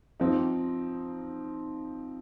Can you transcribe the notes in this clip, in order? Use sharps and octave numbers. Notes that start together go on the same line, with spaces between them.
F3 C4 D#4